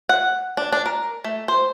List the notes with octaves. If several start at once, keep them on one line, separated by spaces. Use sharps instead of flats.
F#5
D4
D4
A#4
A3
C5